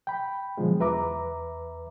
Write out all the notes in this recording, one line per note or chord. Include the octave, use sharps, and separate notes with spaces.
G5 B5
B2 D3 F3 F#3 G#3
E2 B4 E5 A#5 D6